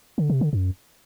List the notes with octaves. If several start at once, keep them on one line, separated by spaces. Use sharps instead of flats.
D3
C3
D3
F#2